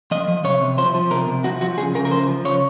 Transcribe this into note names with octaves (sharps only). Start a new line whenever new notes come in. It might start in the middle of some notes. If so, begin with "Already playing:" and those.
F3 D#5
F3
C3 C#5
C3
F3 C5
F3
C3 A#4
C3
F3 F#4
F3 F#4
C#3 G#4
C#3 A#4
A#4
F3 C5
F3
C#3 C#5